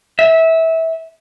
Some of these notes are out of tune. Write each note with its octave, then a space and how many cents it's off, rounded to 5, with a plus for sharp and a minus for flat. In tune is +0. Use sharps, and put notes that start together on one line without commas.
E5 -20